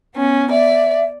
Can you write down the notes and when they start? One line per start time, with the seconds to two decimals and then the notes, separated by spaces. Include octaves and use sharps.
0.14 B3 C#4
0.51 D5 E5